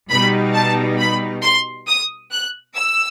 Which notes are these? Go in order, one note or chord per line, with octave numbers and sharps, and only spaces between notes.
B2 G3 D#4 B5
A5
B5
C6
D#6
F#6
E6